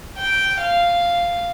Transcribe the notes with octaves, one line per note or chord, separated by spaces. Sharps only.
G5
F5